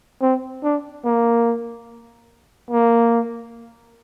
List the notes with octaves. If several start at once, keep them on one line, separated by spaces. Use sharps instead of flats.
C4
D4
A#3
A#3